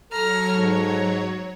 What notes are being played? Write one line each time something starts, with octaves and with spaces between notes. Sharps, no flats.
F#3 A4 C#5 A#5 F6
G#2 A#5